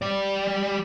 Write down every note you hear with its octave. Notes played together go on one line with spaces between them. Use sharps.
G3 D5